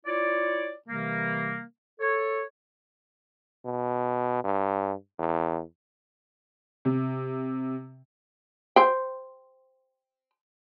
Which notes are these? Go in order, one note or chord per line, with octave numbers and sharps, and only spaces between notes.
E4 F4 C#5 D5
C3 E3 G3 A#3
A4 C#5
B2
G2
E2
C3
C5 G5